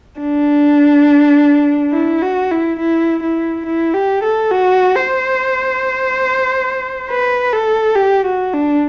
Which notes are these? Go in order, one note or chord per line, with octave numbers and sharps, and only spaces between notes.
D4
E4
F#4
E4
E4
E4
E4
G4
A4
F#4
C5
B4
A4
G4
F#4
D4